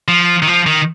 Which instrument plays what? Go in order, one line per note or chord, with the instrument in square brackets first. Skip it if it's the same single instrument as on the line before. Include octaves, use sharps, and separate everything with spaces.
[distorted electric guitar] F3
D#3
F3
D#3